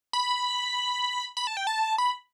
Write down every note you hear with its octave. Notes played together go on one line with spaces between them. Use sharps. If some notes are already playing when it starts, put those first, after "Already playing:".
B5
B5
A5
G5
A5
B5